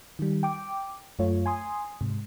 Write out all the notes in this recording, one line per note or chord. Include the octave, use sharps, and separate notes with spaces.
D#3 G3
G5 D6
F#2 A3 F4 C#5
G#5 C6 D#6
G#2 C3